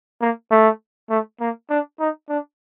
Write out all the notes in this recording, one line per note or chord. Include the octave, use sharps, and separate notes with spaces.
A#3
A3
A3
A#3
D4
D#4
D4